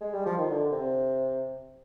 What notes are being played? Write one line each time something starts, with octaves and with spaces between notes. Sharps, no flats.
G#3
G3
F3
D#3
D3
C3